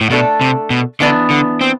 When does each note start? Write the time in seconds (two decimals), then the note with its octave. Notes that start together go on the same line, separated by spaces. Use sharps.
0.01 A2
0.10 B2 A3 D4 A4
0.41 C3
0.70 B2
1.00 D3 E3 B3 D4
1.30 D3
1.61 C4